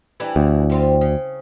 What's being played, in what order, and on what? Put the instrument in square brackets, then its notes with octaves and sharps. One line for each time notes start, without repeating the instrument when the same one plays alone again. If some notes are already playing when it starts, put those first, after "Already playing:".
[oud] E3 G3 D4
[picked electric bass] D2
[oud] G3 C4 F4
C#3